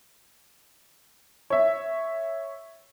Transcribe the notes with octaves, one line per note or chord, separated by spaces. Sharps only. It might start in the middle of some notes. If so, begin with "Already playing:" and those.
C#5 E5